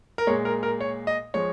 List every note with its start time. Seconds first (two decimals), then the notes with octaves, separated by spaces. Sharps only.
0.18 A#4
0.27 A#2 G#3 C#5
0.45 A#4
0.63 A#4
0.81 C#5
1.07 D#5
1.34 F3 G#3 C#5